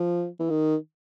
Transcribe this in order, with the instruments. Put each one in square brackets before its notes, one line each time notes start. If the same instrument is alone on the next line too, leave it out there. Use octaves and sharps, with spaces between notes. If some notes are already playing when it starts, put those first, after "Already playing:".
Already playing: [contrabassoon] F3
E3
D#3